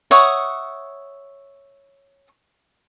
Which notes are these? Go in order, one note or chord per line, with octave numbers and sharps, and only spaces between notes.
C#5 E5 F#5 D#6